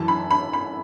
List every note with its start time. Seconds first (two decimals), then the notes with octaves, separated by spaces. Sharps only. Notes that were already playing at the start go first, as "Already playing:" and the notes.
Already playing: F#2 E3 A5
0.08 B5
0.31 B5
0.53 B5